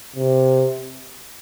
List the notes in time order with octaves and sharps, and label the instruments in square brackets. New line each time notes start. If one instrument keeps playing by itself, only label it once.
[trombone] C3